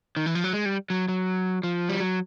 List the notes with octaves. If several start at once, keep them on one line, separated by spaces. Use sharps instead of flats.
D#3
E3
F3
F#3
G#3
G3
F#3
F#3
F3
G3
F#3